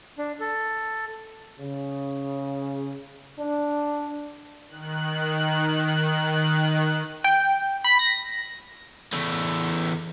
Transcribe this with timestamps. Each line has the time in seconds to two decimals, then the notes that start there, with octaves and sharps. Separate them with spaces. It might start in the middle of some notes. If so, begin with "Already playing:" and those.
0.18 D4
0.40 A4
1.59 C#3
3.38 D4
4.67 D#3 F#6
7.24 G5
7.84 B5
7.99 A#6
9.13 E2 A3